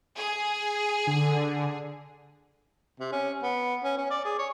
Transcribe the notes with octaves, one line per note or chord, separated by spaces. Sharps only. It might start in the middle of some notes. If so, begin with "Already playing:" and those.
G#4
D3
C3
C#4
B3
C#4
C#4
D5
G#4
C#5